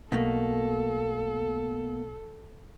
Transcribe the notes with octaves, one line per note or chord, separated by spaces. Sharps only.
B1 B2 A3 A#3 A4